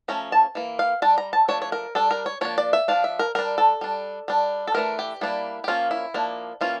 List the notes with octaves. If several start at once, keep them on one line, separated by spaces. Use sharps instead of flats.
F3 A3 C#4 A#5
A5
E3 A#3
F5
G3 D4 A5
A#5
A5
F3 A3 D4 C#5
C#5
A#4
G3 D4 A4
A#4
C#5
F3 A#3 D4 C#5
D5
E5
F3 A3 D4 F5
E5
A#4
G3 D4 A#4
A4
G3 D4
G3 D4
A4
E3 A3 D4 A#4
G4
G3 A#3 D4 E4
G4
F3 A#3 C#4 F4
E4
F3 A#3 D4
E3 A#3 C#4 F4